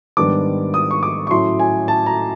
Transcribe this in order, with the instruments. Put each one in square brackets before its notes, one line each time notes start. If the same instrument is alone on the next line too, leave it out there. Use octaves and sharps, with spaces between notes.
[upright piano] G#2 D#3 G3 B3 D4 D6
D#6
C#6
D6
C#6
A2 F#3 A3 C#4 C6
G#5
A5
A#5